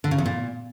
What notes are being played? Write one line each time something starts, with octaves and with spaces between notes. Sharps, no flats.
D3
C#3
E2
A#2